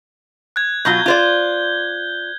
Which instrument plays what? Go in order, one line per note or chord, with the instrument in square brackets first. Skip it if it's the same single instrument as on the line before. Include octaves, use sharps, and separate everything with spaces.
[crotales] F#6 G#6
[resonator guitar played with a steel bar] B2 F#3 F4 [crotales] G6 G7
[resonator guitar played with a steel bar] F4 C5 D5